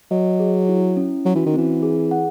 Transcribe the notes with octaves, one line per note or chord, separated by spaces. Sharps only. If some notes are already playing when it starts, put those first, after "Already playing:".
F#3 D#5
G#4
E4
C#4
F#3 F#4
E3
D#3
E3 C4
G#4
F#5